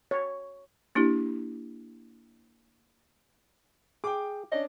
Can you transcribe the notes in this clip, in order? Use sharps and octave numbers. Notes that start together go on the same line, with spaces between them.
C#5
A#3 D4 E4 G4
G#4 G5 D6
C#4 D4 D#5